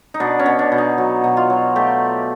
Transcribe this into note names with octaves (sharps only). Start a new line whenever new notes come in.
D#4
B2 D4
C#4
B2
D4
B2
D#4
F#3
B2
F4
F#3
A3 G4